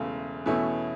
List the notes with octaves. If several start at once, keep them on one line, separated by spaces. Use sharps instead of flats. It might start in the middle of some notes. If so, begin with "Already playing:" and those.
Already playing: E1 E2 C#3 A3
E2 B2 A3 C#4 E4